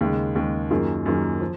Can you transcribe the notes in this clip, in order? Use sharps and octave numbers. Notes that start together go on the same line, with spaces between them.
D#2 C#3 G#3
D#2 C#3 G#3
F#2 D#3 A#3 F4 G#4
F#2 D#3 A#3 F4 G#4
F3